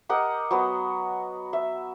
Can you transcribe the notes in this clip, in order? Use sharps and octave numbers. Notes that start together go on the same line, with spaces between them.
G4 A#4 D#5 F#5
F#3 B3 D#5
E5